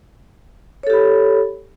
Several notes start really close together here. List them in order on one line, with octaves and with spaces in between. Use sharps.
C#5 A4 G4 B5